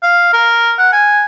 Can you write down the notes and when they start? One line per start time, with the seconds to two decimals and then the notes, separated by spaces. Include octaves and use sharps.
0.03 F5
0.33 A#4
0.79 F#5
0.93 G#5